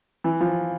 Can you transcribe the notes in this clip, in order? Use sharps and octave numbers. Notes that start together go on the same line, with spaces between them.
E3
F3